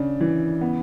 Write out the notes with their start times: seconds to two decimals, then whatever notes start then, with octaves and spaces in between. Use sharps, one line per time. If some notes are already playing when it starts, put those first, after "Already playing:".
Already playing: C#3 D4
0.21 E3
0.61 B3